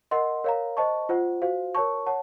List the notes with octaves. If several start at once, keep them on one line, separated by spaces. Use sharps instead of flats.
A#4 D#5 F#5 C6
A#4 C#5 F5 A#5
C5 D#5 A5 C#6
F4 C5 F#5
F#4 C5 F5
A#4 C#5 A5 C#6
C#5 F#5 A5